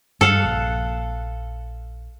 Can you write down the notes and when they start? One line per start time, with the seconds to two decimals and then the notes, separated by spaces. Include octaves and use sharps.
0.21 G2 G3 A4 F5 F#5
0.44 A#1